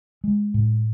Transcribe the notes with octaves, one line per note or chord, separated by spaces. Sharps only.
G#3
A2